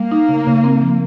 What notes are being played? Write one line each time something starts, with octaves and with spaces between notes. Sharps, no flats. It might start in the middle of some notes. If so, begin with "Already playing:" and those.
Already playing: G3 A#3
D#4
C#3
C#3
C4
F3